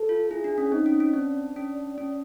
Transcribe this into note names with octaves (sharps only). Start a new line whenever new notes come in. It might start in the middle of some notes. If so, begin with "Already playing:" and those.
Already playing: A4
F4
E4 G#4
D4
C#4
C4 D#4
C#4
C#4
C4 D4
C#4
C#4